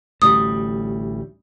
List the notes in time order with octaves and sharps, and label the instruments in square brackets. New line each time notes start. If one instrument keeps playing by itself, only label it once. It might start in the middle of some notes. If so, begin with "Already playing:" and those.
[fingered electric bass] A1 D2 G3 [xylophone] D#6